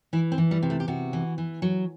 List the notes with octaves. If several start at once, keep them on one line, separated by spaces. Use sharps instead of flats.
E3 E4
C4
E3
G3
C3
A3
G4
C3 F#4
E3
E3
F#3